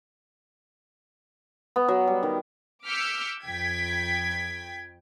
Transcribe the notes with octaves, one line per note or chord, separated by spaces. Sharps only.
B3
F#3
G3
D#3
D6 E6 F6 G6 B6 C#7
F2 G5 G#6 B6